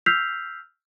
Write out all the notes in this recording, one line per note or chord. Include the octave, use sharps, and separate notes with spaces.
E6 F6 G6 B6 C7 F7